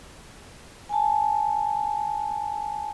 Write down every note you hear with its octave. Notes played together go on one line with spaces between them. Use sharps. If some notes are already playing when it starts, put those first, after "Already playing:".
G#5 A5